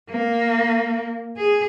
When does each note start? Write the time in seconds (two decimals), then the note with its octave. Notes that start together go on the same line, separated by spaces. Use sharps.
0.10 A#3
1.37 G#4